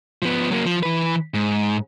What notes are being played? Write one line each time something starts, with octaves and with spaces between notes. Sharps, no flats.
F3 B3
F#3 A#3
F3
E3 B4
G#2